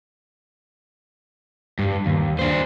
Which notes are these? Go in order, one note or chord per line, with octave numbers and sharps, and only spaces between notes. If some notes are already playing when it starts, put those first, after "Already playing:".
G2
D#2
D4 C5